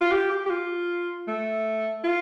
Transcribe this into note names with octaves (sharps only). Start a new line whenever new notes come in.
F4
G4
G4
G4
F4
A3
F4